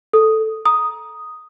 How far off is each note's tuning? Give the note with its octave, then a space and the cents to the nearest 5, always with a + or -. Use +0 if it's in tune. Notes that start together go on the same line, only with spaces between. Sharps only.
A4 +0 D#6 +0
A#5 +20 D#6 +0